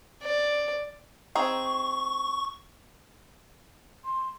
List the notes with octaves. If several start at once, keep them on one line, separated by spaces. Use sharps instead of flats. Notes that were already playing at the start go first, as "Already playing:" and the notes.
D5
C4 D#4 G#4 C#6
C6